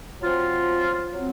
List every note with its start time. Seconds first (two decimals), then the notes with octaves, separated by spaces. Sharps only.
0.20 F#3 C4 F4
1.13 F#3 C4